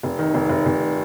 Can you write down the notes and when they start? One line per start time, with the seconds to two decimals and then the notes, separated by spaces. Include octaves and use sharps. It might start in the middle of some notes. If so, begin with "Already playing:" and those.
0.03 F1
0.19 D#3
0.34 F1
0.49 F1
0.66 F1